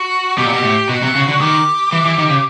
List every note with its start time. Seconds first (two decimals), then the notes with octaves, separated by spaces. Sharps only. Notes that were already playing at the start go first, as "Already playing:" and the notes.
Already playing: F#4
0.38 B2 G4
0.46 A#2
0.54 B2
0.64 A2
0.89 B2 F#4
1.03 C3
1.15 C#3
1.28 D3
1.40 D#3 G4
1.92 E3
2.05 E3
2.18 D#3
2.30 C#3